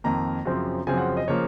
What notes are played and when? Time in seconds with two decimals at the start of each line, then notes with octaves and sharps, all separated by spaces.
0.04 F2 D#3 A#3 A#5
0.45 F#2 C#3 F3 C4
0.87 F#2 C#3 F3 C4 G#5
0.97 F#5
1.17 D#5
1.28 C#3 F3 A#3 C#5